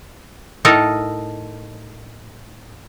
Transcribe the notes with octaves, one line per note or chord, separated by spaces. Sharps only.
A2 D#4 A4 A#4 D#5